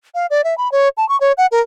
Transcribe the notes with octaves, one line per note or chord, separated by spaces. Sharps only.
F5
D5
E5
B5
C#5
A5
C#6
C#5
F#5
A#4